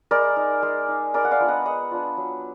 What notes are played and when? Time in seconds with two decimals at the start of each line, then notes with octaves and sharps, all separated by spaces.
0.11 G#3 A#4 D5
0.36 D#4
0.62 G#3
0.88 D#4
1.14 G#3 A#4 D5
1.25 F#5
1.31 D5 F5
1.40 B3 D4 F4
1.48 D#5 F#5
1.65 G#3 D#5 F#5
1.91 B3 D4 F4
2.17 F#3